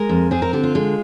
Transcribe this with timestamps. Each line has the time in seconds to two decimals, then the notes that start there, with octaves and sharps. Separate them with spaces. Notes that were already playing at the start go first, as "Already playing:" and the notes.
Already playing: G#3 A#4
0.09 F2
0.31 C4 G#4
0.42 A#4
0.53 D3 G4
0.63 F4
0.75 G#3